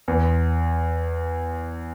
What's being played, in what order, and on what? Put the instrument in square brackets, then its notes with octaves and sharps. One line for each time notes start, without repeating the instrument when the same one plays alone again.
[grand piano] E2